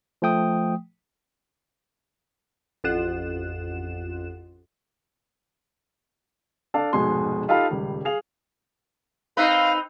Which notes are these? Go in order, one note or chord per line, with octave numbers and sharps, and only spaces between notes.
F3 A3 G5 D#6
A1 F2 F4 F#5 F#6 E7
D4 A4 D5 F5 A5
F1 G#2 B2 G#3 G#5 C6
D#4 F4 G4 A4 F5 B5
D#1 C#2 G3
G#4 F5 F7
C4 D#4 B4 F5